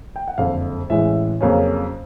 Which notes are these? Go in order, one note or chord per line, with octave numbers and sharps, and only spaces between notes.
G5
F#5
F#1 F2 D3 F5
A1 A2 E3 G#3 E5
F2 C#3 F#3 A#3 C#4